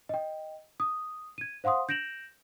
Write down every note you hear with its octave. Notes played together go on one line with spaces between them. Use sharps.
D#5 G5
D#6
G#6 D#7
C5 F5 F#5 C6 D#6
G6 A#6 D7 E7 F#7